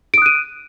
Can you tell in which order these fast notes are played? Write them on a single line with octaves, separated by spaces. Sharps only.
D7 D#6 F#6 D#7